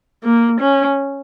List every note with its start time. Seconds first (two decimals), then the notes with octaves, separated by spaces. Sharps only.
0.24 A#3
0.60 C#4